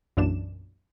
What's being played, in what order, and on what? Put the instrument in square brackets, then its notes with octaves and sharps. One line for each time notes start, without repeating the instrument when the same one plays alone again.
[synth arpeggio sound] B1 F#2 A#2 E3 D4 E7